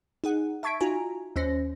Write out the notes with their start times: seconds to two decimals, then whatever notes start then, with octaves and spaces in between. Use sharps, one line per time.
0.24 D#4 G#4 F#5
0.63 E5 A5 C#6 G#6 B6 D7
0.80 D#4 F4 F#4 G#5 A#5
1.36 D#2 C#4 C5 A#6